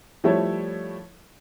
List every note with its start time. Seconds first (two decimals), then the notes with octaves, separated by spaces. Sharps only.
0.24 F3 G3 A3 E4 A4 C#5